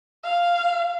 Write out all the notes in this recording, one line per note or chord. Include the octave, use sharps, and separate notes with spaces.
F5